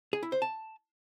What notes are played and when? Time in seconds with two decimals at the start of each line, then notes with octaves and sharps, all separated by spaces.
0.13 G#4
0.23 E4
0.32 C5
0.42 A5